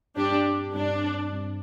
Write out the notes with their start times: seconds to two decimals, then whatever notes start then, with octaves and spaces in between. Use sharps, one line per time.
0.16 G2 G3 C4 D4 G4
0.74 G2 G3 C4 D4
1.32 G2 G3 C4